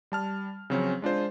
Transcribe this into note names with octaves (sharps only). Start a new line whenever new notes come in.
G3 A5 F6
C#3 F3 F#3 C4 C#4
G#3 D4 F4 C5